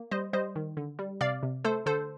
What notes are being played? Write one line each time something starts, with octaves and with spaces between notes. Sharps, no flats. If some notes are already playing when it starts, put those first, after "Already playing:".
Already playing: A#3
G3 C5 D#5
G3 C5 D#5
D#3
D3
G3
C3 D5 F5
C3
A3 A4 C5
D3 A4 C5